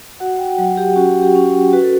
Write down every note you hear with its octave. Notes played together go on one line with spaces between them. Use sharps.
F#4 F#5
G5
F#3 F#5
G4
C#4 F#4
G4
C#4
F#4 B4
A4